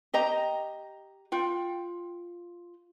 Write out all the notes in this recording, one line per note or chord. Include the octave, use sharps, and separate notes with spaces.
G4 D#5 A#5
F4 G5